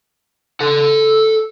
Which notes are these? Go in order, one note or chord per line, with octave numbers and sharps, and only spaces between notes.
A4 F#5